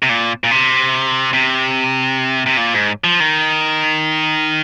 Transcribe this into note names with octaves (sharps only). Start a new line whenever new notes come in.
C3
A#2
A#2
C3
C3
C3
A#2
G#2
F3
D#3